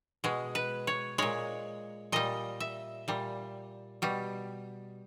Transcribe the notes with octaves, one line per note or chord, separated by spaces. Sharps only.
B2 G#3
B4
C#5
A#2 G#3 C#5
A#2 G3 D#5
E5
A#2 G3
B2 G3